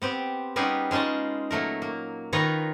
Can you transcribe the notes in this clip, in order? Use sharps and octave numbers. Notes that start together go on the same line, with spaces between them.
B3 C4 G4
G3 B3 C#4 D#4 G4 G#4
G#3 C#4 D#4 F4 A5
A#2 F#3 A3 A#4
A#3
D#3 D#4 F4 B4 C#5 A#5